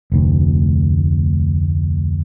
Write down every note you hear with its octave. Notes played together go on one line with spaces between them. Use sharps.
F1 D2